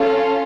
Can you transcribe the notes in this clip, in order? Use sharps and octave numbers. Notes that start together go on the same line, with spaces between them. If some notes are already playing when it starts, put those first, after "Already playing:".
Already playing: C#4 F4 A4